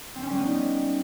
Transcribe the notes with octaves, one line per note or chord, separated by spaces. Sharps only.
C4
C#4
G3
B3
D#4